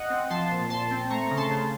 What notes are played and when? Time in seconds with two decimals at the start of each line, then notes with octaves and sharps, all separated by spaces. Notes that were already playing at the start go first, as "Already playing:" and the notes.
Already playing: D#5 F#5
0.10 C4
0.30 F3 A5 C6
0.51 A#2
0.70 A#2 A5 C6
0.90 C4
1.10 A3 A#5 C#6
1.30 C#3
1.37 A5 C6
1.50 C#3